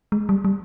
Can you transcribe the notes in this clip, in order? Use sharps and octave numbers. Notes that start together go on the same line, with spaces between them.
G#3
G3
G3